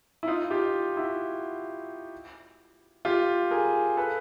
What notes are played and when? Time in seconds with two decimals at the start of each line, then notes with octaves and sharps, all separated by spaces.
0.23 E4
0.28 D#4 F4
0.51 F4 G4
0.97 E4 F#4
3.05 F4 G4
3.51 G#4 A#4
3.97 A4 B4